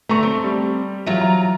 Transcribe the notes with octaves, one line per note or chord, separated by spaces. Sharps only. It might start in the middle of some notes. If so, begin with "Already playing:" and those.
D2 A3 B3 A#5 C#6
C4
G3
E3 F#3 F4
A#5